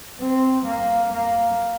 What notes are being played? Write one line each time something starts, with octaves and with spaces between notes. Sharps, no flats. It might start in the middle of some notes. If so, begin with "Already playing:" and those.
C4
A#3
A#3